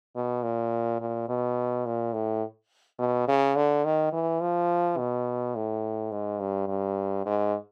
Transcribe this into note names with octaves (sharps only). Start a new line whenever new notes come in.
B2
A#2
A#2
B2
A#2
A2
B2
C#3
D3
D#3
E3
F3
B2
A2
G#2
G2
G2
G#2